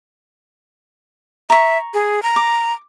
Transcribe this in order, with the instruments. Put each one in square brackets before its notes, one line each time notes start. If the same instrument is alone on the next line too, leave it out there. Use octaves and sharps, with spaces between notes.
[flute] E5 [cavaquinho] A#5 C#6
[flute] G#4
A#5
[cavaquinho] D6